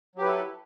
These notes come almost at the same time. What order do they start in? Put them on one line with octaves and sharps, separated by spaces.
F#3 G4 B4 E4 A4